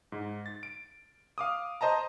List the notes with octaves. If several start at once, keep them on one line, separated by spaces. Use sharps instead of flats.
G#2
A6
D7
F5 D6 D#6
C5 D#5 A5 A#5